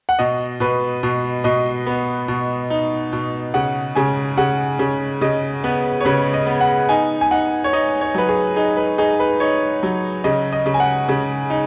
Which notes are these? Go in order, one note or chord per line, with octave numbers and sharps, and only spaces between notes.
F#5
B2 D#5
B2 B4
B2
B2 D#5
B3
B2
D#4
B2
C#3 F#5
C#3 G#5
C#3 F#5
C#3
C#3 D#5
B3 B4
C#5
C#3 B4
D#5
B3
F#5
D#4 G#5
G#5
D#4 F#5
C#5
D#4 D#5
C#5
F#3 B4
G#4
D#4 G#4
B4
D#4 G#4
B4
D#4 C#5
F#3
C#3 D#5
D#5
C#3
G#5
F#5
C#3
D#4